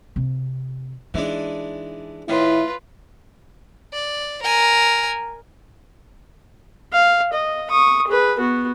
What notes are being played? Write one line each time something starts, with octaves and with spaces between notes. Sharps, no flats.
C3 C4
E3 G#3 D4 D#4
A2 D#3 E4 F4 B4
D5
A#4 G#5
F5
D#5
C#6 D#6
G#4 B4
B3 F#4